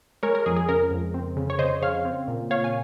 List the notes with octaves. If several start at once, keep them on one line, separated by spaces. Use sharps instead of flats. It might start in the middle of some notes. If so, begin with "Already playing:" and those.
G#3 A#4 C#5
A#4
F2 G#4
G#4
C#3 A#4
F2
C4
C#3
C#5
C#3 C5 D#5
C#3 C#5 F5
C4
A#2
A#2 C#5 F5
G#5